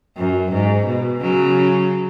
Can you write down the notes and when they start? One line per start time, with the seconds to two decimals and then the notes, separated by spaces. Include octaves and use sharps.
0.17 F#2
0.52 G#2
0.86 B2
1.21 C#3 F#3